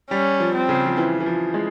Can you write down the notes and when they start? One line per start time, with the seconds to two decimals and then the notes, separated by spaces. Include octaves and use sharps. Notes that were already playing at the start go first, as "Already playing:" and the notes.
0.11 G3 C#4
0.40 F3
0.55 C4
0.69 C#3
0.86 F3
0.97 E3
1.20 E3
1.26 F3
1.54 G#3